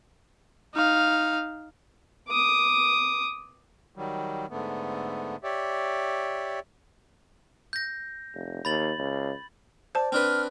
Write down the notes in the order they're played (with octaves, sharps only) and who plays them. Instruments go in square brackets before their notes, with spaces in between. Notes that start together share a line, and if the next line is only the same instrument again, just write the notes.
[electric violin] D#4 F5
[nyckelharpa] D6 D#6
[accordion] D#3 F#3 G3
G#2 D3 A3 B3
G4 C#5 D5 E5
[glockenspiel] G6 A#6
[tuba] F1
[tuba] D#2 [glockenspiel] B5 A6 F#7
[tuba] C#2
[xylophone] C5 A5 [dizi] D5
[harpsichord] C4 D4 B4 [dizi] F6